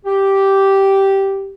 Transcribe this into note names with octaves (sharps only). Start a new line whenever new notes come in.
G4